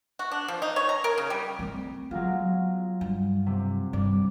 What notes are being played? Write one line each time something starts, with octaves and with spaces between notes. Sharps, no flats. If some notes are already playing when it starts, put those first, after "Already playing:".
F#4
D4
F3
D#4
C#5
A#5
A#4
C#3
G3
A3 C4
F#3 G#3 B3 F4
G2
C3
G2 D5